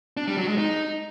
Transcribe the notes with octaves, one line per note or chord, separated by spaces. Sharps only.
D4
G3
F#3
G#3
D#4